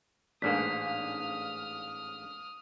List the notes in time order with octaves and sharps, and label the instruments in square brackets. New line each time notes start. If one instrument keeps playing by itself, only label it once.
[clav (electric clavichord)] A1 G#2 A#3 [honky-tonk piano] D4 F5 [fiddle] D#6 F6 [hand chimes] B6